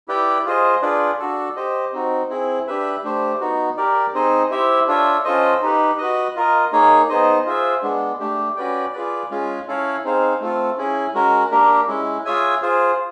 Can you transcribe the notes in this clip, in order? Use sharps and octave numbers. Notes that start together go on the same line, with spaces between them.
E4 G4 B4 D5 G5
F4 G#4 C5 D#5
D4 F4 G#4 B4 D5
D4 F#4 A4
G4 C5 D#5
C4 D#4 F#4
C4 E4 G#4
D4 G4 B4 E5
A3 D4 G4 C5
B3 D#4 F#4
G4 A#4 D5
C4 D#4 G#4 C5 D#5
E4 G4 C5 E5
D4 F4 A4 C#5 E5
C#4 F4 A4 C5 D#5
D#4 G4 B4
F#4 B4 D#5
F4 A#4 D#5
A#3 D#4 G#4 C#5
B3 D#4 G#4 C5 D#5
F4 G#4 C5 E5
G#3 B3 D4
A3 D4 G4
C#4 F#4 B4 D5 G5
F4 G#4 B4 D5
G#3 C#4 F4 G#4
C#4 E4 A4 C#5 F5
C4 D#4 G#4 C5 F5
A3 C4 F4 A4
C#4 E4 G#4
G#3 C#4 F#4 A#4
A#3 D4 G4 A#4
G#3 C#4 E4
F4 G#4 C#5 E5 G#5
F4 G#4 C5